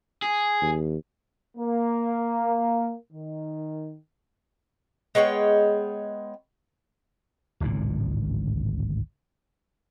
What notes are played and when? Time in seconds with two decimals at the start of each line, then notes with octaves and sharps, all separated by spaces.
0.22 G#4
0.62 D#2
1.57 A#3
3.13 D#3
5.15 G#3 B3 C#5 G5
7.60 D1 G#1 C#2 A#2